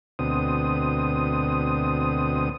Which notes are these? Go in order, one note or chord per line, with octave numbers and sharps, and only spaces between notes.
D2 B2 C4 D#6